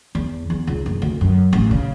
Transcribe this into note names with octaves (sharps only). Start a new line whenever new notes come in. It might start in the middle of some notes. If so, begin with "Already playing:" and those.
E2
E2
C#2
F#1
D2
F#2
A1
C#3